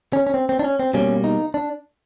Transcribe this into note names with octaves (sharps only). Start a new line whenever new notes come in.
C#4
C#4
C4
C4
D4
C#4
C4
B2 G3 A#3 C#4
D#4
D4